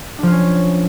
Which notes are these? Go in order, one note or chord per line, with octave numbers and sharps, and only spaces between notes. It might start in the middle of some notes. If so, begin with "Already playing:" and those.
F3 C#4 D4 F4